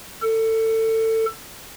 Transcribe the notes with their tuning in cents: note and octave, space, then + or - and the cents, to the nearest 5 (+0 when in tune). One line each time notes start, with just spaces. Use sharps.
A4 +25